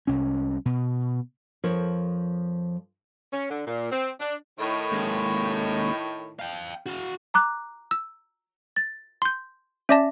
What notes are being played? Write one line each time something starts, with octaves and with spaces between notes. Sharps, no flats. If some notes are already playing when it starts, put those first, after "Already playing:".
C2 C#4
B2
F2 F3 A#4 C#5
C#4
D3
A#2
C4
D4
A2 D#3
D#2 G#3
F5 G5
F#4 F5
A#5 D6 F#6
E6
A6
C6 G6
C#4 D5 E5 A5 D6 A#6